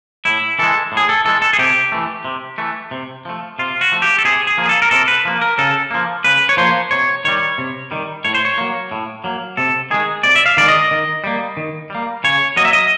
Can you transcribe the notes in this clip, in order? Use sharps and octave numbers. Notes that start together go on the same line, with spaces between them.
A2 E4
E3 G#3 A4
A2
G#4
A4
E3 G#3 A4
A4
G#4
C3 G4
E3 A3
C3
E3 A3
C3
F3 A3
C3 F4
F#4
F3 A3
G4
A4
C3 G#4
G#4
F3 A#3
G#4
A4
A#4
C3 A4
B4
F3 A#3
A#4
C#3 A4
F3 A#3
C#3 B4
C#5
F3 A#3 C5
C3 C#5
D#3 G3 C#5
C3
D#3 G3
A2 C#5
C5
C#5
F#3 A#3
A2
F#3 A#3
C3 A4
D#3 G#3 G#4
C3 D5
E5
F5
D#3 G#3 D5
D#5
D#3
G3 A#3
D#3
G3 A#3
C#3 C#5
F#3 A#3 D#5
E5
D#5